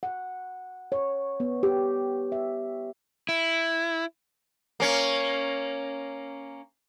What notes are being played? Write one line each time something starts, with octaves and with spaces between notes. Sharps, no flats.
F#5
C#5
B3
G4
E5
E4
A#3 C#4